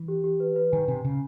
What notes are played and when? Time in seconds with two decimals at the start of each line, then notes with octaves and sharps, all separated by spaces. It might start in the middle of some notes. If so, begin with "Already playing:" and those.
Already playing: E3
0.08 G4
0.24 G4
0.40 B4
0.56 B4
0.72 D#3 G#5
0.88 C3 G#5
1.04 C#3 G#5